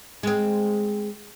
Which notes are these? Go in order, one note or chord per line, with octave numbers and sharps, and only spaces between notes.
G#3 C4